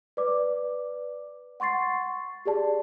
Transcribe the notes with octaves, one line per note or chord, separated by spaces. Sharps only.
B4 D5 D6
F#5 C6 C#6 A6 C7
G4 G#4 D5 A5